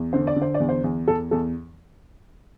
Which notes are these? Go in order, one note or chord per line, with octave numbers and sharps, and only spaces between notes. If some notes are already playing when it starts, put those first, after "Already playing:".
Already playing: E2
D3 C5
D5
D3
C5
D5
E2
C5
E2
E2 A4
E2 A4